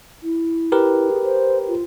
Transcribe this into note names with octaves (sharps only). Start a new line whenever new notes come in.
E4
G4 A#4 B4
G#4
C5
F4